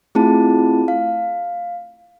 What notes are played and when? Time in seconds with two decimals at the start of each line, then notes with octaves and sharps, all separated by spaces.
0.15 A3 C4 E4 F4 G#4 A5
0.88 F5